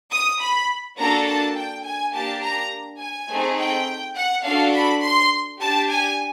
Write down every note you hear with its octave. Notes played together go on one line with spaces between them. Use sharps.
D#6
B5
A#3 D4 F#4 A4 A#5
A5
G5
G#5
A#3 D4 G4 A5
A#5
G#5
A3 C4 D#4 G#4
G5
F#5
D4 F#4 A4 F5
B5
C6
D4 G4 A5
G#5